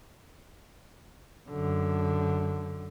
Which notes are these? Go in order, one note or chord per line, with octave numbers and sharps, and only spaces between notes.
F#2 D3